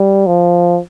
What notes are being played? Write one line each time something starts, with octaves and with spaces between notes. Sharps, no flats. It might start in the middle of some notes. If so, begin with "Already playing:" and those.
Already playing: G3
F3